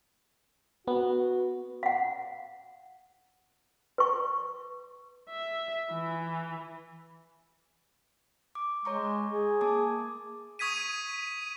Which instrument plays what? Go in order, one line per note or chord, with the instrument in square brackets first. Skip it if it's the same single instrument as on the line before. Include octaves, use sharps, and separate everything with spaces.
[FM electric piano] B3 [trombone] F#4
[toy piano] F5 F#5
B4 C#6
[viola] E5
E3
[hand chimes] D6
[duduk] G#3 [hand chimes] C#5 A#5 C#6
[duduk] G#4
[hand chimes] A#3 A5 D6
[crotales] C#6 D#6 G#6 B6 D#7